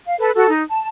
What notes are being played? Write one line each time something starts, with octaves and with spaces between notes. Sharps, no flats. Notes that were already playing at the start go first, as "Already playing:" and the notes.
F5
A4 B4
F#4 A4
D#4
A5